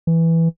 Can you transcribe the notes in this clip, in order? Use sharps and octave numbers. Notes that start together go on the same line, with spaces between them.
E3